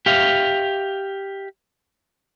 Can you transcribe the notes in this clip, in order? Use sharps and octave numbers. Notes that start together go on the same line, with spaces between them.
G4 E5 F5